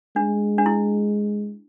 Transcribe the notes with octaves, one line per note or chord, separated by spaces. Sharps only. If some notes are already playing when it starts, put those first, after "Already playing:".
G#3 D4
D4
E4